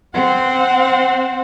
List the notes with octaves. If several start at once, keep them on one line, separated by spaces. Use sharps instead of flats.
C4 F#5